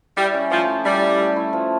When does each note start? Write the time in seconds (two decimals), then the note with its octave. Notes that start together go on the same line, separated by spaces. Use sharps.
0.17 G3 E4
0.34 C#4
0.51 F3 A3
0.68 E4
0.85 G3 E4
1.02 E4
1.19 A3
1.36 E4
1.53 F3